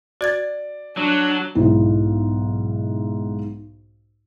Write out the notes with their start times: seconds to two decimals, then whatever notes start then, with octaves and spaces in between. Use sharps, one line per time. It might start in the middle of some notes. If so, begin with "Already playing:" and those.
0.21 F#4 D5 G#6 A6
0.97 F#3 D4
1.55 B1 G#2 E4